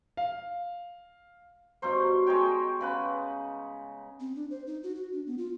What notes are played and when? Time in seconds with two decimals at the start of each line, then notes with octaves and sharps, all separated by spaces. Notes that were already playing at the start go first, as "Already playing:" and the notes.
0.17 F5
1.82 G2 B2 F#3 C5
2.27 G#3 D#4 C#5 G5
2.81 C#3 B4 F#5
4.20 C4
4.36 D4
4.51 C5
4.67 D#4
4.83 F#4
4.95 F#4
5.13 D4
5.27 B3
5.38 F4